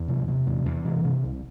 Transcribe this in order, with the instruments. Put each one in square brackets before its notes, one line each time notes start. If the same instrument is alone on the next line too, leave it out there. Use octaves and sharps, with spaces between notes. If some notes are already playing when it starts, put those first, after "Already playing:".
Already playing: [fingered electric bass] E2
C3
C3
E2
E2
C3 E3
C3
C2